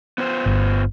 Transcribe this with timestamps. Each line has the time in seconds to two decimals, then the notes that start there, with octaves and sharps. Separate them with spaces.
0.18 B3 F4 C5
0.46 G1